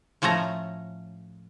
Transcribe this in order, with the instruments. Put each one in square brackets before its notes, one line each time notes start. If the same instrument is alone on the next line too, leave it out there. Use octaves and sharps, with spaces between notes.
[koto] A2 F3 A3 C#4 A#5